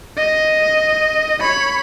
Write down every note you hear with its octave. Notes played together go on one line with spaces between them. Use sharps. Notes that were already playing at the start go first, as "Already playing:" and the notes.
D#5
C#5 B5